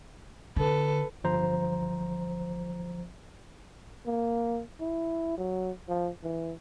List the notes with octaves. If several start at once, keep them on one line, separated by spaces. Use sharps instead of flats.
D3 A4 B4
G1 F3 C5 A#5
A#3
E4
F#3
F3
E3